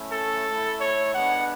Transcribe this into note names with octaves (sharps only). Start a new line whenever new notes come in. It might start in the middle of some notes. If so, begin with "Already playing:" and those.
Already playing: A3 C#4 E4
A4
A3 E4
C#5
G#3 B3 D4 F#5